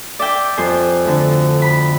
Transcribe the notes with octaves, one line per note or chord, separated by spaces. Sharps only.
D5 E5 G5
F2 C5 G#5
D2 D3
B5